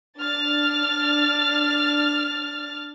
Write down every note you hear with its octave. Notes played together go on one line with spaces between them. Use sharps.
D4 F6 A6